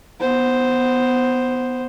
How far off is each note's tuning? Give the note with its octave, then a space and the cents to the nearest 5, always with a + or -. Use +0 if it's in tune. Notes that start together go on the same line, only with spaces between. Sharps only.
B3 +0 C5 +0